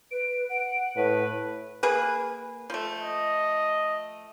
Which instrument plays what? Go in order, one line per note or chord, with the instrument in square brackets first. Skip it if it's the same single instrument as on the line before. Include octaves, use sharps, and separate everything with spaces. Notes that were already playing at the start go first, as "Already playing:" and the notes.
[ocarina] B4 [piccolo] D7
[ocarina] F#5
[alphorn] A2 [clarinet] B4
[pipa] A#3 G#4 B4
F3 A3
[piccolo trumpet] D#5